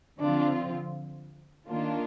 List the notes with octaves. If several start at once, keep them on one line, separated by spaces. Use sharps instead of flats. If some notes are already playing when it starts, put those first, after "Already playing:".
D3 F3 C4 D4 F4
D#3 A#3 D4 F4